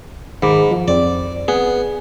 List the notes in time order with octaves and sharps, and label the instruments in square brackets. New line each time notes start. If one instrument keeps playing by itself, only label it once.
[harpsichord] G#2 [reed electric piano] D#3 B5 D6
[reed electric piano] F3
[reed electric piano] F2 C4 [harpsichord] D5
[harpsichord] B3 [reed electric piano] G#4